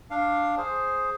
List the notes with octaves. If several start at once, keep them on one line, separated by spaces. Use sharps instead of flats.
D4 F5
G#4 C5